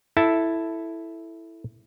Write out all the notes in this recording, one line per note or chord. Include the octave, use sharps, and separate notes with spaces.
E4 A4 A5